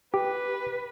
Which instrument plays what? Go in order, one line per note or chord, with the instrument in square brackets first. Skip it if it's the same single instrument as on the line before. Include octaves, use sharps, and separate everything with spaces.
[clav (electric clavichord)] G4 [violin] B4